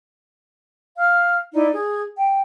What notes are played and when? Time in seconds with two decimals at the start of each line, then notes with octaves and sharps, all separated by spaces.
0.97 F5 F6
1.54 D#4 E4 D5
1.72 G#4
2.17 G5